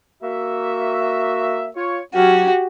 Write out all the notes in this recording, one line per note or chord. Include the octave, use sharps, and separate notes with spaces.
A#3 F#4 E5
F4 C#5
F#3 C#4 F#4 G4